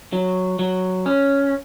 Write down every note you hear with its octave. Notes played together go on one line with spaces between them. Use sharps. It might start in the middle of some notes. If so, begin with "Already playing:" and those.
F#3
F#3
C#4